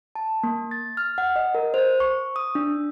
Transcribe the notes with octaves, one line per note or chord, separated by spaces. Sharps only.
A5
A#3
A6
F6
F#5
D#5
A#4
C5
C#6
D#6
D4